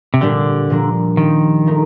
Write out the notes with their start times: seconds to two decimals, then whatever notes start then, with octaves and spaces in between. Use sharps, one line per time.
0.14 C3
0.21 A#2 D3 G3 D4 G4
0.70 A#2 F3 A#3 D4
1.17 D#3 F3 C4 G4
1.66 F3 A3 D#4 A#4